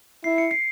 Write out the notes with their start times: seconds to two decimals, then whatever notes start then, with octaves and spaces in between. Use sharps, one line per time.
0.24 E4 C7
0.38 C#7
0.51 C7